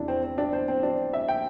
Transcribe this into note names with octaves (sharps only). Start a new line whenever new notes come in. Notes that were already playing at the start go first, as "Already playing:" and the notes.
Already playing: E2 C3 D4 E4
C4
C4
D4
C5
C4
D4
E5
G5